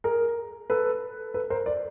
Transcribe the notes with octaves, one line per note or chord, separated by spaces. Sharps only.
G#4 A#4
A4 B4
A4 B4
A#4 C5
C5 D5